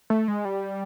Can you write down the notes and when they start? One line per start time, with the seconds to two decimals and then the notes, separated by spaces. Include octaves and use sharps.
0.10 A3
0.28 G#3
0.45 G3